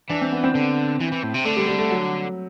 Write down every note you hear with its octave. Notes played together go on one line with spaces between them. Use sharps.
E3 D4
C4
B3
C4
D3
E3
E3
A2
C3
D3 A3
G3
G3
A3
F#3